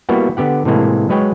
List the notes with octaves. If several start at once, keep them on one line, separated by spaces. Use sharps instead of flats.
G3 A#3 B3 E4 F#4
D3 B3 G4 F#5
A2 C3 E3 G#3 A#3
F#3 G#3 B4 C#5 G5